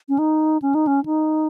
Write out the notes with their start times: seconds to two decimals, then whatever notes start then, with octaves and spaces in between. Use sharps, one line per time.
0.09 C#4
0.19 D#4
0.62 C#4
0.75 D#4
0.87 C#4
1.05 D#4